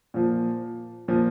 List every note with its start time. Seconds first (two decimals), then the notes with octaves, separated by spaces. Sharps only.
0.14 A#2 F3
1.08 A#2 F3